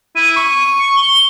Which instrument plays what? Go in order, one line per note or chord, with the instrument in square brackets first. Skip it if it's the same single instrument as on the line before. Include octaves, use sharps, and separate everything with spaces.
[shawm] E4 [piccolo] D#7
[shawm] C#6
[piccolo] C#7
G7